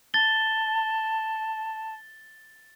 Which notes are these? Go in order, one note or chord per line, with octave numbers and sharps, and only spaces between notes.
A5 A6 G7